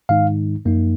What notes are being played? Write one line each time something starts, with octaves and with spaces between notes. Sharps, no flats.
G#2 D#3 G#3 D#4 F5
F#2 F3 A#3 D#4